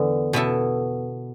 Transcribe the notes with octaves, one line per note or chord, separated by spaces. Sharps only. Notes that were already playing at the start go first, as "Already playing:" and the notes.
Already playing: E2 D3 B3
B2 B3 E4 A4